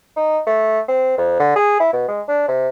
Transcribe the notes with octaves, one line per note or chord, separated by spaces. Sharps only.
D#4
A3
C4
F2
D3
G#4
E4
B2
G#3
D4
C3